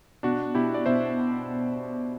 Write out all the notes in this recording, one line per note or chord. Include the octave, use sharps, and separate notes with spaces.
B2 D4 F#4
B2 E4 G4
D5
B2 C5 E5